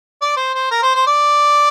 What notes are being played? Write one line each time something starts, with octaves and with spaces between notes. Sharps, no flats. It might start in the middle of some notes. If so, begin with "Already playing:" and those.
D5
C5
C5
A#4
C5
C5
D5